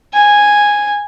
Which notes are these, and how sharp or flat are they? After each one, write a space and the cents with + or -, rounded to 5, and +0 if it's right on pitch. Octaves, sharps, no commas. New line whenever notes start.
G#5 -5